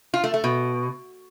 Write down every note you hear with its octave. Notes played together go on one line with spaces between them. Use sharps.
F4
A3
A3
B2